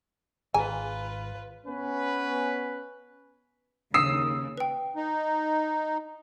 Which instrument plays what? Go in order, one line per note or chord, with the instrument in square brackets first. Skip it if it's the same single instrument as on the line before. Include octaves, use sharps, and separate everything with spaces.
[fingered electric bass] G#1 [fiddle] F4 B4 [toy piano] G#4 A#5 [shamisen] G#5
[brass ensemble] B3 C#4 B4
[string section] D#2 C#3 [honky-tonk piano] D#6 E6 C7
[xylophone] B4 G5
[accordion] D#4